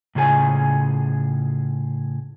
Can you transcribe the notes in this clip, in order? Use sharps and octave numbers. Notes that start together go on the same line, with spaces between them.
A2 C#3 F4 G#4 G#5